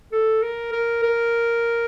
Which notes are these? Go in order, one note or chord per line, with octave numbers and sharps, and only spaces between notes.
A4
A#4
A#4
A#4